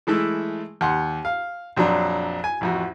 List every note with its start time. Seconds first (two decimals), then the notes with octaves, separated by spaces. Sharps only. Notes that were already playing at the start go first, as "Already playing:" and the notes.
0.07 E3 G#3 A3 E4
0.81 D#2 F#5 C6
1.25 F5
1.76 A#1 F2 F#3 D4
2.44 G#5
2.61 A1 F2 F#4